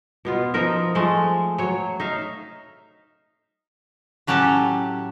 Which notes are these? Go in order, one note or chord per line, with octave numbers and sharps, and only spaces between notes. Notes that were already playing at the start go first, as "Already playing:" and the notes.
B2 B3 F4
F3 D#4 A#4 E5
F3 G#3 A3
F#3 C#5
D#4 E5 F5
A2 F#3 C#4 G4 A4